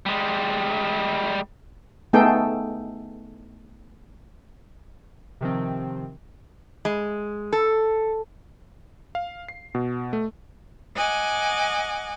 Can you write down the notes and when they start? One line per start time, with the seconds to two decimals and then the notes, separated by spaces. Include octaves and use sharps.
0.06 G3 G#3
2.13 A3 B3 D#4 G#4 A4 G5
5.41 C3 D#3 F3 C4
6.85 G#3
7.52 A4
9.15 F5
9.48 C7
9.75 B2
10.13 A3
10.95 D#5 F#5 G#5 D6